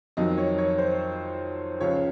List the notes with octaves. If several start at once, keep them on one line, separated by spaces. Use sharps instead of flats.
F2 D#3 F#3 D#5
C#5
C#5
C5
C#2 C#3 F3 C#5